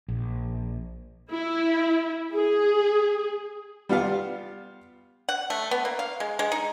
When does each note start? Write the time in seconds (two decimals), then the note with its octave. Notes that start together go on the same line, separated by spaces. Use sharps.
0.08 A#1
1.31 E4
2.34 G#4
3.89 G3 B3 F4 F5
5.29 F#5
5.50 A3
5.71 B3
5.85 A#3
5.99 F5
6.20 G#3
6.39 G#3
6.52 D#4